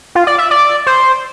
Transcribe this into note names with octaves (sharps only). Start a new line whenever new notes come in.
F4
D5
E5
D5
C5